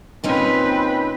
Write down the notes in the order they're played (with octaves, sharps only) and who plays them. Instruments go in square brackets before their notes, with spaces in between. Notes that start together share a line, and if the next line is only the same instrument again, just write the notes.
[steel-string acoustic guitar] A#2 C#4 D#4 [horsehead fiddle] C4 B4